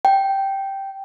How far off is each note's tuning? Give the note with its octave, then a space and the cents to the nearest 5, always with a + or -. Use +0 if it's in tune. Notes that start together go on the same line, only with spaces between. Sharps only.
G5 -5